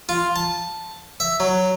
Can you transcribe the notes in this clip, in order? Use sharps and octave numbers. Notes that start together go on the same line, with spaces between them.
F4
A5
E5
F#3